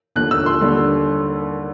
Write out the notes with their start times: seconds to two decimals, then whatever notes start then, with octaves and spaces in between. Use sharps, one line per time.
0.16 D#2 D3 F3 F#6
0.31 E6
0.46 C6
0.61 D#2 D3 G3